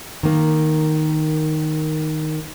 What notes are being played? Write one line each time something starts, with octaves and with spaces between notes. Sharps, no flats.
D#3 A#3